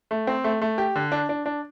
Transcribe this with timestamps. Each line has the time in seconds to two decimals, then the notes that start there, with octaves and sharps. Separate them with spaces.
0.11 A3
0.27 C4
0.44 A3
0.62 A3
0.78 G4
0.96 D3
1.12 D4
1.29 D4
1.46 D4